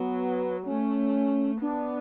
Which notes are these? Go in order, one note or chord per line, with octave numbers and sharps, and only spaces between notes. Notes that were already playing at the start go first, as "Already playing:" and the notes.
Already playing: F#3 B3
A3 C#4
B3 D4